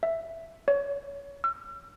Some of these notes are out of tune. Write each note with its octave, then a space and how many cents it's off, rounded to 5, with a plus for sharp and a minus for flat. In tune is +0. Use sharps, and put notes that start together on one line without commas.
E5 +5
C#5 +25
E6 +45